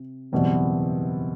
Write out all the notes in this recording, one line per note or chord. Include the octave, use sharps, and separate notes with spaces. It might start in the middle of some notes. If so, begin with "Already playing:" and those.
Already playing: C3
F#1 E2 B2 G3 C4